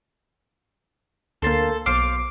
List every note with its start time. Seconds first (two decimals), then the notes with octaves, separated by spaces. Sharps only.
1.42 D2 A#3 A4 C5 A5
1.86 B1 C5 F5 D6 F6 D7